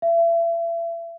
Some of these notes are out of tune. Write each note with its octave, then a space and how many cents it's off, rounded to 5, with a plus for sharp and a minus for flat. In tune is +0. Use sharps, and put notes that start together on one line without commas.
E5 +35